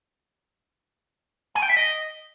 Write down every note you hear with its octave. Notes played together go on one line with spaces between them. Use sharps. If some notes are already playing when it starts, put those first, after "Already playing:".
G#5
G5
E5
D#5